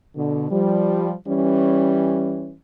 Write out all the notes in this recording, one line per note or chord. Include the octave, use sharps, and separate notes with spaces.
B2 D3
F3 G3
E3 G3 C#4